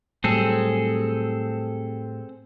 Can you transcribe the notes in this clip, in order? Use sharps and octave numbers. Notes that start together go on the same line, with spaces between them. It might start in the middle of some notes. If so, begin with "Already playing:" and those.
A2 F#3 G3 C4 G#4 A4